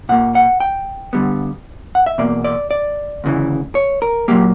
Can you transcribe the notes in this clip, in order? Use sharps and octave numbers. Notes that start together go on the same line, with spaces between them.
A#2 A#3 F#5
F#5
G5
G2 D3 G3 B3
F#5
E5
E2 B2 A#3 D5
D5
D5
D2 C#3 E3
C#5
A#4
A#2 F#3 A#3 G4